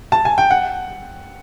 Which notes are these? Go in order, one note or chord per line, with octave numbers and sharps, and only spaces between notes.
A5
G#5
G5
F#5